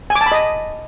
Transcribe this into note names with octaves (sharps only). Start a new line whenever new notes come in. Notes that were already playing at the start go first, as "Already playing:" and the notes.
G#5
D6
A5
B5
D#5